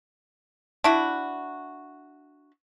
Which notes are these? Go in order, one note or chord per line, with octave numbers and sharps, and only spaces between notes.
D4 E4 F#4